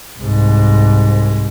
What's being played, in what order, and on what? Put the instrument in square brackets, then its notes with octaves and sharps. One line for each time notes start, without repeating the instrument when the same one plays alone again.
[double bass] C2 G#2